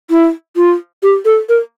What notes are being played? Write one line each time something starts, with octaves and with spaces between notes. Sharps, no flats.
E4
F4
G4
A4
A#4